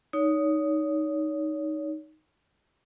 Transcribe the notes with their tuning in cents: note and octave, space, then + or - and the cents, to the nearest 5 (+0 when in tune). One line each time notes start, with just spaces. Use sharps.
D#4 +0 C#5 +35